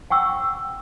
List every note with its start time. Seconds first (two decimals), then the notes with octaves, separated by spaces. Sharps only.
0.10 F#5 G5 C#6 E6